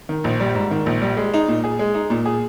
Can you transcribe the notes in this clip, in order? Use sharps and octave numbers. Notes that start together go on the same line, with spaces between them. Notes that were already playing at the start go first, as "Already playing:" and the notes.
D#3
A#1
G3
G#2
D#3
A#1
G3
G#3
D#4
A#2
G#4
G#3
D#4
A#2
G#4